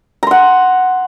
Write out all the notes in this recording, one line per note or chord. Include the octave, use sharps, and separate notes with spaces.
F#5 A#5 C6